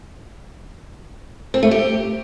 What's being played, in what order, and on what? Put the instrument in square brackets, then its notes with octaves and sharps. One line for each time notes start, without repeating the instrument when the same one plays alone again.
[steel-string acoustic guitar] C4
A3
G4